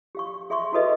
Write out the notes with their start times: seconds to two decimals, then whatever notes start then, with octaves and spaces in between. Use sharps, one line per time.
0.15 G4 F5 C#6
0.50 G#4 E5 C6 C#6
0.72 E4 F#4 A4 B4 D#5 E5